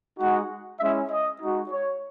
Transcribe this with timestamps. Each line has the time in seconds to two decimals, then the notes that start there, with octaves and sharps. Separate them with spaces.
0.19 G#3 D#4 F#4 F#5
0.79 G#3 C#4 E4 E5
1.10 D#5
1.40 G#3 D#4 F#4
1.70 C#5